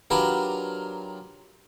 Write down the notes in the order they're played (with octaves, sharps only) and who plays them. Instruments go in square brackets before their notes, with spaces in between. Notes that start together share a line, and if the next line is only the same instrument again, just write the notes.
[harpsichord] F#3 D4 F4 G4 A#4 B4